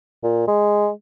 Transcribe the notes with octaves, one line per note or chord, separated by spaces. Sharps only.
A#2
G#3